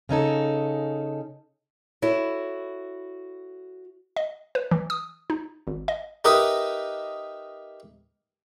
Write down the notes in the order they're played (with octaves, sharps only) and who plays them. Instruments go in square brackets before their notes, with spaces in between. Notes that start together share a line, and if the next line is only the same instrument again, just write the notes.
[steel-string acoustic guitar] C#3 C#4 D#4 A4
[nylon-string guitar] E4 F#4 A4 C#5
[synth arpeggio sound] D#5
B4
E3
D#6
D#4
G#1
D#5
[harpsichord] D#4 G4 A#4 B4 D#5 E5